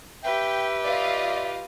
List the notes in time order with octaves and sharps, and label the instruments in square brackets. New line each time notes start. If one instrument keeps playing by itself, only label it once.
[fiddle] G4 B4 [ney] E5 [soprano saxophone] G5
[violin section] F4 D#5 F5 [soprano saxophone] D5